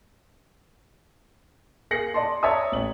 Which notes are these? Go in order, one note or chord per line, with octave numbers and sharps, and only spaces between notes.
A#3 G#4 A#6 C7 C#7 F#7
D5 D#5 A5 C6
C#5 D5 E5 A5 A#5 D#6
A1 F#7